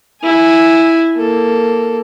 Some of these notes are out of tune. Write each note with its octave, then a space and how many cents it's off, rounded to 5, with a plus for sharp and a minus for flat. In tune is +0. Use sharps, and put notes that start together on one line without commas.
E4 +0 G#5 +0
A#3 +0 A4 +0